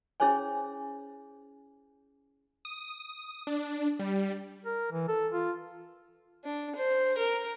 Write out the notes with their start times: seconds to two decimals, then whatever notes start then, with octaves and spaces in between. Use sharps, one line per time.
0.20 C#4 E4 G#4 C5 C#5 G#5
2.65 D#6
3.47 D4
3.99 G3
4.65 A#4
4.92 E3
5.08 A4
5.33 F4
6.44 D4
6.76 C5
7.18 A#4